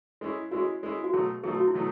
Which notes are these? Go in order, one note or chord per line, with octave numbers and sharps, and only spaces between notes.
G#3 C#4 E4
G#3 C#4 E4 F#4
G#3 C#4 E4
F#4
B2 F#3 A3 G#4
B2 F#3 A3 G#4
F#4
E4
B2 F#3 A3